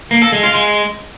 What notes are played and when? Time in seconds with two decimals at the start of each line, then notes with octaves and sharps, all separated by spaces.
0.11 A#3
0.22 A4
0.32 G#3
0.43 F4
0.54 G#3